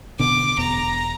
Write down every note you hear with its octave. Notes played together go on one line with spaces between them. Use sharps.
B2 D3 D6
E1 B2 A#5